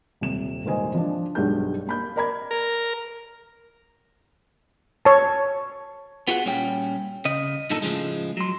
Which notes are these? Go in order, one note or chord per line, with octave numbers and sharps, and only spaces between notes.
D#1 C3 E7
D#1 G#1 D#2 C5 D#5 G#5
F3 D4
B1 G2 G#3 G4 G6
A#3 B5 G6
A#4 D5 A#5 B5 G#6
A#4
C#5 A5
B3 F4 F#4 G#4 F#5
A#2 G3 C#4 D5 G5
C#3 D#5
G2 A#2 D#3 D#4 A4
A2 C#3 F3 G#3
F#3 C6